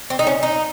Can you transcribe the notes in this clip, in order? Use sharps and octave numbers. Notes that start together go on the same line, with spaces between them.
C4
D#4
C#4
D#4